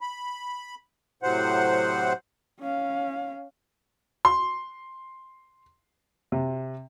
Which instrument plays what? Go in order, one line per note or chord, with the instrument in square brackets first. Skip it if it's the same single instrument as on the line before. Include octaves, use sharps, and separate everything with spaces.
[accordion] B5
A2 C3 F#3 C5 F#5
[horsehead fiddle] C#4 F5
[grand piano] C6
C3